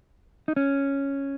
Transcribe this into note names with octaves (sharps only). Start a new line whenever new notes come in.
D#4
C#4